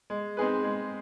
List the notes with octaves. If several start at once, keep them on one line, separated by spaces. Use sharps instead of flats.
G#3
C4 D#4 G#4 B4
G#3